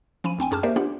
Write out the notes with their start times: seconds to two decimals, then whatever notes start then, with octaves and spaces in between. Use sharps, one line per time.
0.24 F3 C#4 B5 D#7
0.39 D2 C4 G5 G#5
0.51 F#2 C#4 G#4 A5 D6 F6
0.63 A#3 G4 A#4 C5 D5 E5
0.76 B3 D4 F4 G4 F#5